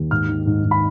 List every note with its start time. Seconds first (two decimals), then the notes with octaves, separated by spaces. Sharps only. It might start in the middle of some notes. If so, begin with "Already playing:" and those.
Already playing: D#2
0.11 G#2 F6
0.29 D#3
0.46 G#2
0.64 G#2
0.71 B5